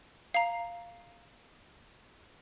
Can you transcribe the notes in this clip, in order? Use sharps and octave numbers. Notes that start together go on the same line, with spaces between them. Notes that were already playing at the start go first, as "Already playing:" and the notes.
F5 A#5